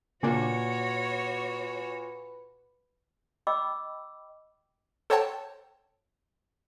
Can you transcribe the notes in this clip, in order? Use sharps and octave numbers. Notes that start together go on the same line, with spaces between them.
A#2 C#3 A#3 D4 F#4 B4 C#5
D#5 G5 B5 D6 E6
A4 C5 C#5 F#5 G5 A5